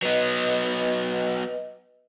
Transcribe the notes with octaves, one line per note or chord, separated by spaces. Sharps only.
F#3 B3 B4 D#5